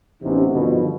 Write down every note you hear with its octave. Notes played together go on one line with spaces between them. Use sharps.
A1 C3 E3 B3 C#4 D#4
G2 B2 D3 D#3 F3